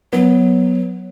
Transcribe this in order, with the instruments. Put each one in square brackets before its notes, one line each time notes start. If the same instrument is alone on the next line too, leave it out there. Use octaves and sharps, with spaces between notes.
[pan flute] F#3 [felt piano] B3